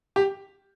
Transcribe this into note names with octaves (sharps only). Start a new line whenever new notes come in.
G4